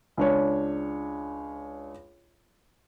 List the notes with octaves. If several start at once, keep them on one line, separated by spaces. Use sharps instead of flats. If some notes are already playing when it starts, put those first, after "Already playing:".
C#2 D4 C#5